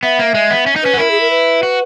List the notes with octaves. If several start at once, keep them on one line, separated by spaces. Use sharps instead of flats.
B3 E5
A#3
G#3
B3
C#4
D#4
C#4 B4
F#4
E4 A#4
G#4
A#4
B4
F#4